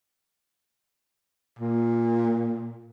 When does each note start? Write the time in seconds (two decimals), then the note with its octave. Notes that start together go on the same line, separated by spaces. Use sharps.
1.59 A#2